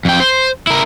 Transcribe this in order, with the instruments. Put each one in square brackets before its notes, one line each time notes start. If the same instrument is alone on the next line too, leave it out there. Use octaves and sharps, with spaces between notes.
[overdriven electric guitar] F2 G5
C5
E4 A#4